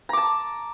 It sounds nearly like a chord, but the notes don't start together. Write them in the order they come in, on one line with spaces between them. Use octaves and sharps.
A#5 D6 A5